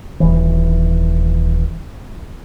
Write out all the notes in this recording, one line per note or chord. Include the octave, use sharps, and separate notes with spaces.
D#1 E3